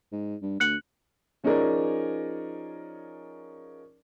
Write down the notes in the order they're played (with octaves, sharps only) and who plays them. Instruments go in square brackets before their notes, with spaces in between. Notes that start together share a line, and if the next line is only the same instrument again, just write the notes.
[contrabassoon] G#2
G2
[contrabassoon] D2 [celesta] F#6 C#7 F#7
[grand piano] F3 C#4 D#4 G#4 A#4 D5